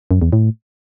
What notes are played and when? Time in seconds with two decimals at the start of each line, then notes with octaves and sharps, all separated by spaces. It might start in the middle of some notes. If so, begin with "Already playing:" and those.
0.11 F#2
0.22 E2
0.33 A2